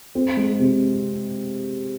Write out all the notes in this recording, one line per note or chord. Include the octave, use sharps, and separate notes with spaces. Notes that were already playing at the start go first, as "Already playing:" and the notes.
C4
G#3
C3